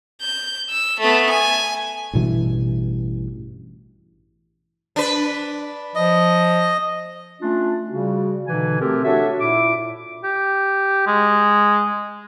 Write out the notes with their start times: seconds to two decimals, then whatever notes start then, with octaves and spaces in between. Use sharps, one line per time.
0.21 G6
0.69 E6
1.00 A3 B3
1.29 G#5
2.13 A1 G2 B2 E3
4.96 D4 B4
5.95 F3 D#5
7.41 A3 C#4 D4 F4
7.90 C#3 G3 F#4
8.48 B2 D3 E3 D#4 G#5
8.81 A3 C4 G4 A4 A#4
9.05 D4 F#4 A4 C#5 E5
9.41 A#2 E4 E5 D6
10.24 G4
11.07 G#3